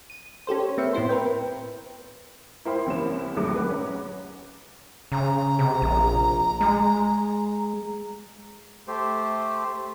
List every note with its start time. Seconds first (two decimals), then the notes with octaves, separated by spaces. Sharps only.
0.10 D#7
0.47 C#4 G4 A4 C5
0.60 C#5
0.78 A#3 C4 B4 E5 C#7
0.93 A2 B3 E4 C5 C6
1.09 A#4 B4 G5
2.65 E4 A#4 C5 G5 B5 C6
2.86 C2 C3 E3 A#3 C#4 E7
3.36 A#1 D#2 A2 F#3 D6
3.54 G#4 B4 F#5
3.70 C#4 A#5
5.12 C#3 A#5
5.59 C3
5.82 A#1
6.61 G#3
8.88 A3 G4 C5